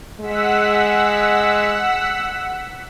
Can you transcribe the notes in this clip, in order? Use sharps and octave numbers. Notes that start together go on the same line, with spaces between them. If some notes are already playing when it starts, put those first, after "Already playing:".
G#3 F#5 E6 B6